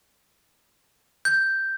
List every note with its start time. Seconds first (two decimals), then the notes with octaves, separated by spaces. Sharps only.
1.25 G6